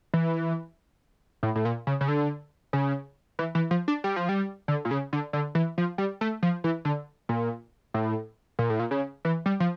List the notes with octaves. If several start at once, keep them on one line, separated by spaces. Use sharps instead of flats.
E3
A2
A2
A#2
C#3
C#3
D3
C#3
E3
E3
F3
D4
G3
F3
G3
D3
A#2
C#3
D3
D3
E3
F3
G3
A3
F3
E3
D3
A#2
A2
A#2
A2
A#2
C#3
E3
G3
F3